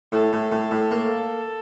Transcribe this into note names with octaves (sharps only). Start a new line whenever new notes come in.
A2 A4
A2
A2
A2
A#3